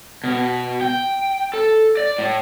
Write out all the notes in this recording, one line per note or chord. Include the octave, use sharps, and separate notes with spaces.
B2
G5
A4
D5
A2